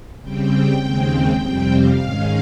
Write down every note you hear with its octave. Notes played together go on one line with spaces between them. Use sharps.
C#3 G3 C4 G5
D#2 C#3 G#3 C4
F2 C3 G3 C4 G5
F5
G#2 D#3 G#3 C#4